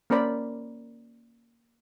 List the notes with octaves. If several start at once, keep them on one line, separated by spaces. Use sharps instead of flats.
A#3 C#4 A#4 C5 D5 B5